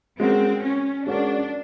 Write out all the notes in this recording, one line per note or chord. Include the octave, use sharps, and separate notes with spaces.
G#3 C4 C#4 F#4 A#4
C#4
G#3 C#4 D4 F#4 A#4